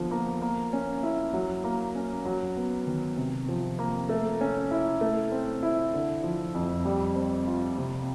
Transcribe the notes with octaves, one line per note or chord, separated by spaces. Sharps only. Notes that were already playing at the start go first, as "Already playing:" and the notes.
Already playing: D3 F3 B3
A#3
A#3
C#4
E4
F#3
A#3
C#4
F#3
B3
D#3
C3
F3
A#3
A3
C#4
E4
A3
C4
E4
D3
F3
F2
G3
C4
F4
C3